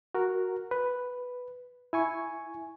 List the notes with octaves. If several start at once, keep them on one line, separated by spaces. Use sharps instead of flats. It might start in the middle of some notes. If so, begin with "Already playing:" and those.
F#4 A#4
B4
E4 G#5 C#6